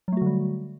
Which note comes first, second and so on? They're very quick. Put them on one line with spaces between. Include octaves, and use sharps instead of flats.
F#3 A3 F#4 D3 G3